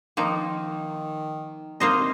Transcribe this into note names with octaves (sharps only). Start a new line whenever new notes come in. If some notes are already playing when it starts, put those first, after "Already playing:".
D#3 F3 A#3 D#4
C3 A#3 D#4 C5 D#5